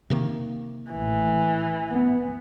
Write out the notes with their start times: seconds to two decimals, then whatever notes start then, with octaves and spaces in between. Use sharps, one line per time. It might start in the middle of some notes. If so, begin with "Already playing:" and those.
0.10 C3 D#3 A#3
0.92 A1 E3
1.91 B3